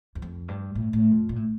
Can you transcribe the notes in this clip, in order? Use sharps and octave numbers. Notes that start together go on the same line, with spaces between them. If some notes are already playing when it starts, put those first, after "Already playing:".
E2
F2
G2
A2
A2
F2
A#2
A2